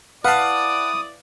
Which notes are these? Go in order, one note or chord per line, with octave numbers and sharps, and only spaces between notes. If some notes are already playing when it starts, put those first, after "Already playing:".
E4 B4 D5 F5 F#5 A5 B5 D#6